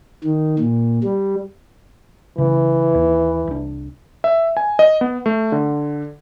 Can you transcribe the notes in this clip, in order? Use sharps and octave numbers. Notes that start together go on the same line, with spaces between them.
D#3
A#2
G3
B1 C#3 E3
D#2
C2 D4
E5
G#5
D#5
B3
A3
D3